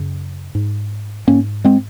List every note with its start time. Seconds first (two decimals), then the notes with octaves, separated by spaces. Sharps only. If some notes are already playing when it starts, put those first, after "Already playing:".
Already playing: F#2 C#3
0.55 G#2
1.27 G#2 A#3 C#4
1.65 G#3 C4